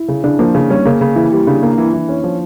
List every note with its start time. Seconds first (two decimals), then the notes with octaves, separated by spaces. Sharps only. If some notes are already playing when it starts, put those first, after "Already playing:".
Already playing: E4
0.08 C#3
0.24 C#3 D4
0.39 F3 A#3
0.55 C#3
0.70 G3 C#4
0.86 C#3 A#3
1.01 C#3
1.16 E3 E4
1.32 G3
1.47 C#3 D4
1.63 A#3
1.78 E3
1.93 E3
2.09 C#4
2.24 F3